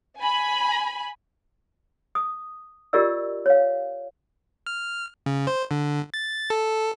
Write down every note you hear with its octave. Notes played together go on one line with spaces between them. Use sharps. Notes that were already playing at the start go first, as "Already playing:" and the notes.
G#5 B5
D#6
F4 G4 A#4 D5 D#5 E6
C#5 F5
F6
C#3
C5
D3
A6
A4